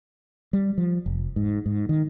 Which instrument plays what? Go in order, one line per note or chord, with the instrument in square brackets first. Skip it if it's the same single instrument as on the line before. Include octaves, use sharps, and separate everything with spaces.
[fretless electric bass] G3
F3
F1
G#2
G#2
D#3